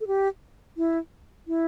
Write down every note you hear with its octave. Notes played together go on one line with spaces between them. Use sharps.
A4
G4
E4
E4